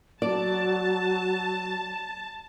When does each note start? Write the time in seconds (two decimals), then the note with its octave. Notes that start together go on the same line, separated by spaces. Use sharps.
0.22 F#3 D5 A5